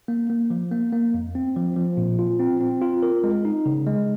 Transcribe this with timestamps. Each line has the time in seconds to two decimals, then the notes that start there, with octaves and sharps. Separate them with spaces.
0.08 A#3
0.30 A#3
0.50 F3
0.72 A#3
0.93 A#3
1.14 F2
1.35 C4
1.56 F3
1.77 F3
1.97 A#2
2.19 F4
2.39 C4
2.61 C4
2.81 F4
3.03 A#4
3.23 G#3
3.45 D#4
3.66 C#3
3.87 G#3